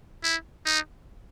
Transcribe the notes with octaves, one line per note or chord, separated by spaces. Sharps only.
E4
D#4